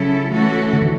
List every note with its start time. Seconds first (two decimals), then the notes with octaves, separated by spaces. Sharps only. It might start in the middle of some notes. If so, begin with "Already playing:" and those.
Already playing: C#3 F#3 C#4 E4 A4
0.30 E3 A3 C#4 F#4 A4
0.73 D3
0.82 E3